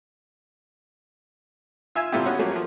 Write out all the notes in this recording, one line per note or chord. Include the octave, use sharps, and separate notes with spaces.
F4 E5 G#5
A#2 D3 C4 E4 F4 G4
B3 C#4 F#4
F3 F#3 A3 A#3 C#4 F#4
F3 F#3